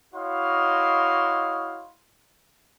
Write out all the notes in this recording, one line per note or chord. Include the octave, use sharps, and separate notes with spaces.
E4 F#4 C#5 D#5 F5 C6